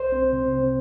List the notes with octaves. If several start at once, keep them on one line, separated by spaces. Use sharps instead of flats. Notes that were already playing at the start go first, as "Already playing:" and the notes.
Already playing: C2 C5
C4
C3
C4